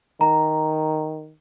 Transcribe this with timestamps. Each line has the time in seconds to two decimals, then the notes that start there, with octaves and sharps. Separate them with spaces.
0.21 D#3 A#5